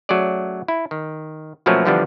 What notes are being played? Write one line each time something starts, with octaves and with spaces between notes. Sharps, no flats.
F#3 A3 C#4 G#4 D5
E4
D#3
B2 F3 F#3 A3 A#3 C#4
D3 E3 F3 G3 B3 D4